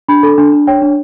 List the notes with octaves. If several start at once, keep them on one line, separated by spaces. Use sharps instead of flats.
D4 B5
A4
D4
D4
C#5 G5
D4